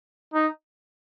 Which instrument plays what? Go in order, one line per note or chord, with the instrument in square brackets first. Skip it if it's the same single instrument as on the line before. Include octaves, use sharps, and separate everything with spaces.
[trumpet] D#4